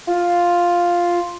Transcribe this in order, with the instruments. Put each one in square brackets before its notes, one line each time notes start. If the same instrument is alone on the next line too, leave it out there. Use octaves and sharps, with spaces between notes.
[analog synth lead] F4